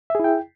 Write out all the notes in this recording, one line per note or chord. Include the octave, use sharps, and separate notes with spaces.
E4 G#4 E5 G5